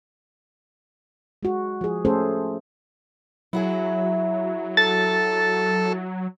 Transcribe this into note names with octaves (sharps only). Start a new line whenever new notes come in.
G#3 F#4
F3 G#4
A3 C#4 G#4 A4 C5
F#3 E4 F#4 G#4
A4 A6